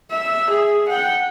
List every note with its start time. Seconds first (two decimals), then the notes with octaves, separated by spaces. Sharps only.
0.11 E5
0.50 G#4
0.88 F#5 G5